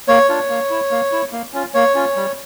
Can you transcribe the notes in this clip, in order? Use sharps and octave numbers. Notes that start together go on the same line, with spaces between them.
A#3 C#5
D4 F4
A#3
E4
A#3
E4
A#3
C#4 F4
A#3 C#5
C#4 F4
G3